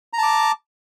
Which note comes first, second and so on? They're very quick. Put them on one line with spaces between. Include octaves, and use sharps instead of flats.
A#5 A5 D6